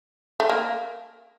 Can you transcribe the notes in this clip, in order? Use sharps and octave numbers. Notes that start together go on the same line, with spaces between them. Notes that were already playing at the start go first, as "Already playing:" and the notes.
A3
A#3